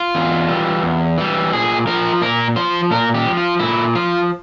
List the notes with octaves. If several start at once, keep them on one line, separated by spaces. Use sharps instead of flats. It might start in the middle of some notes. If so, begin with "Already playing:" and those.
Already playing: F4
E2
E3 G3
E2
E3 G3
A#2 G#4
F3 A#4
A#2 A#4
F3 C5
A#2 A#4
G4
F3
F4
A#2 E4
F3 F4